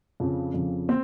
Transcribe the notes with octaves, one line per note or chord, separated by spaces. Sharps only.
F2 C#3 F3
F2 C#3 F3
C4